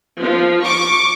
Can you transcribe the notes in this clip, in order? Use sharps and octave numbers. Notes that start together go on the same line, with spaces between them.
F3
C#6 D6